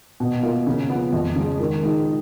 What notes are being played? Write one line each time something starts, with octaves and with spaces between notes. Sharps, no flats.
B2
A#3 F4
C#3
F3 B3
F2
C#3 G#3
D#3
G#3 D#4